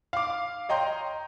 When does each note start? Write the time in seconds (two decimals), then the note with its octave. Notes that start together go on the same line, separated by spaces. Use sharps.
0.13 F5 D6
0.69 C#5 D#5 G5 A#5 C6 G6